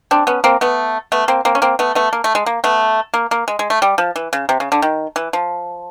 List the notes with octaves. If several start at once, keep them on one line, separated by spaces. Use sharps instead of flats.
C4 D4
B3 C#4
A#3 C4
A3 B3
A3 B3
A#3 C4
A#3 C4
C#4
A#3 C4
A3 B3
A3 B3
A#3
A3
G#3
A#3
A3 B3
A#3
A#3
G#3
G#3
A3
G3
F3
E3
C#3
C3
C#3
D3
D#3
E3
F3